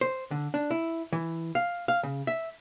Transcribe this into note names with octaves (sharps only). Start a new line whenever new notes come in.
C5
D3
D4
E4
E3
F5
F5
C#3
E5